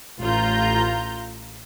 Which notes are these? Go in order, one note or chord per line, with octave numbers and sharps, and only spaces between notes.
A1 F4 A#5 G6